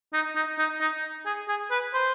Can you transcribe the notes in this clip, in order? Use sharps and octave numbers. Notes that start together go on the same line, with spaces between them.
D#4
D#4
D#4
D#4
G#4
G#4
B4
C5